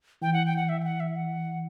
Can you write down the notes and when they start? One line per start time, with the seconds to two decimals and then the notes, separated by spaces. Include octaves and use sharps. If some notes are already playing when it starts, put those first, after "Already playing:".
0.22 E3 G5
0.33 F#5
0.46 G5
0.57 F#5
0.69 E5
0.80 G5
0.84 F#5
1.00 E5
1.16 F#5